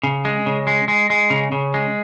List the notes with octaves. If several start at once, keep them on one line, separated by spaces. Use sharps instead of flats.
C#3
G#3
C#3
G#3
G#3
G#3
C#3
C#3
G#3